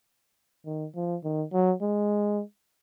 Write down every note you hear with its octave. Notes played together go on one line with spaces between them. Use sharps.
D#3
F3
D#3
F#3
G#3